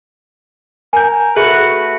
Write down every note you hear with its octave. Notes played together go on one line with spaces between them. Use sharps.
A#4 G#5 G6
A3 F#4 G#4 B4